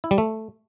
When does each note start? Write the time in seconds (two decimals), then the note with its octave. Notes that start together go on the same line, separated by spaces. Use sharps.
0.04 E4
0.11 G3
0.18 A3